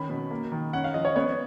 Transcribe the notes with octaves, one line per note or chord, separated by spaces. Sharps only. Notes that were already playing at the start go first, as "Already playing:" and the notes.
Already playing: D#3 C#4 B5
B2
A#3
D#3
C#4 F#5
F5
F3 D#5
C#5
B3 C#5